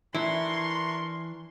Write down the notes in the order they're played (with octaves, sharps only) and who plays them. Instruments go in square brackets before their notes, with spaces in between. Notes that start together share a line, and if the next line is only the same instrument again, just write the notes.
[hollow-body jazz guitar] E3 [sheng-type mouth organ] D4 A#4 C#6 [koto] E4 [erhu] C6